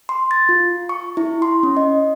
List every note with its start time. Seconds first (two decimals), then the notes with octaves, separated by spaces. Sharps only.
0.09 C6
0.31 A6
0.49 F4
0.89 C#6
1.17 E4
1.42 C6
1.63 C#4
1.77 D#5